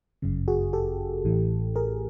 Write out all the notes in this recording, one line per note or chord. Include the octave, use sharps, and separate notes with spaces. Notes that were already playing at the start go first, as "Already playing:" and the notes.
G1 F#2 C#3
F#4 G#4
G4 A4
A1 A2 E3
G#4 A#4